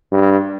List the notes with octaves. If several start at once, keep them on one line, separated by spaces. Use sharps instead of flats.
G2